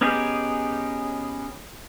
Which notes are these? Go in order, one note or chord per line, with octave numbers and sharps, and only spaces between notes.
B3 C#4 D#4 G4 G#4